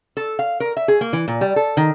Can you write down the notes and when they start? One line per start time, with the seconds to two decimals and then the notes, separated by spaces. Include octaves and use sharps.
0.17 A4
0.39 F5
0.60 A#4
0.77 E5
0.88 G#4
1.01 A#3
1.13 E3
1.28 A#2
1.41 G3
1.56 A4
1.77 D#3